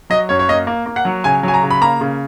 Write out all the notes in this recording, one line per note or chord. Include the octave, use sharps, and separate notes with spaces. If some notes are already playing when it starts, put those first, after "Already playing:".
F#3 D#5
F#2 C#5
C#5
A#3 D#5
A#3
A#3
F#5
F#3
C#3 G#5
F#3 G#5
A#5
C#3
B5
A#3 A#5
C#3